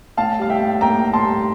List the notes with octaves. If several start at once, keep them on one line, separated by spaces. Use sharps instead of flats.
A2 F5 A5
G3 F5
E5 G5
A2
A#3 G5 A#5
A2
A5 C6
G3